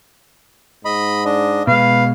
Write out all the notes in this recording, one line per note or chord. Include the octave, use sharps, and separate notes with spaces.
G#2 D#5 B5
D4 D#5
B2 G#3 B4 F5